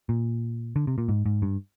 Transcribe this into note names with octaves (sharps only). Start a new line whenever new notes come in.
A#2
D3
C3
A#2
G#2
G#2
G2